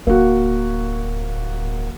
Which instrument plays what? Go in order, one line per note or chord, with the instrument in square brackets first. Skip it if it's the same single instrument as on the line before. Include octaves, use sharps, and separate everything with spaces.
[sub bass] D1 [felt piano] A#3 F#4